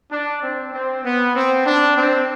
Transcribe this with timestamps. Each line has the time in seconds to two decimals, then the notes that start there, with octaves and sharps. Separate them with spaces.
0.11 D4
0.42 C4
0.72 C4
1.03 B3
1.35 C4
1.65 D4
1.96 C4